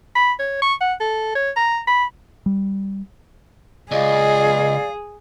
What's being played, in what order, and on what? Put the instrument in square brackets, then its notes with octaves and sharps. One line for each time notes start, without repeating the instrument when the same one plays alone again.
[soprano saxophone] B5
C#5
C#6
F#5
A4
C#5
A#5
B5
[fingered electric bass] G3
[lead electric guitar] C#2 [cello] G#4 [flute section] D5 F5 [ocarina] D#5